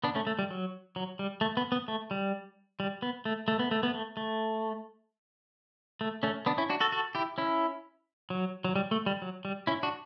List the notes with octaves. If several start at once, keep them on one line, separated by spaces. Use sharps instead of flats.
B3 D4
A3 C#4
A3
G3
F#3
F#3
G3
A3
B3
B3
A3
G3
G3
B3
A3
A3
B3
A3
B3
A3
A3
A3
A3 C#4
B3 D4
C#4 E4
D4 F#4
F#4 A4
F#4 A4
E4 G4
C#4 E4
F#3
F#3
G3
A3
G3
F#3
G3
C#4 E4
D4 F#4